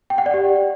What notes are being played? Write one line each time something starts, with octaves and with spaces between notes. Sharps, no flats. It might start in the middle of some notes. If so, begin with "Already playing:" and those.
G5
F#5
D5
G4